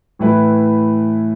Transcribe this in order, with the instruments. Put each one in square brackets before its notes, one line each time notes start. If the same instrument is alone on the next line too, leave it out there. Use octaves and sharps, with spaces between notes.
[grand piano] A2 E3 A3 E4 B4